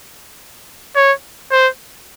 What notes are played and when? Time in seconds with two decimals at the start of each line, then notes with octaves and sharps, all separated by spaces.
0.96 C#5
1.51 C5